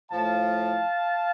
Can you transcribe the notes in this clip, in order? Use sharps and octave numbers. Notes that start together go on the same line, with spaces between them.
A2 F3 F5 A5